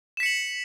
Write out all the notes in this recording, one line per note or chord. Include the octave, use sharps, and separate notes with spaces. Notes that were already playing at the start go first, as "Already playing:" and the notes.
B6 C#7 E7 F#7